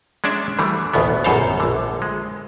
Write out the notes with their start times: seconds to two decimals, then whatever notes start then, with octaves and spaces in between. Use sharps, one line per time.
0.24 G#3 C#4 D4 D5 E5
0.59 D3 E3 G3 A3
0.94 A1 D2 B2 B3
1.24 A#1 F#2 B2 A4 C5 F5
1.60 A#1 D3
2.02 G#3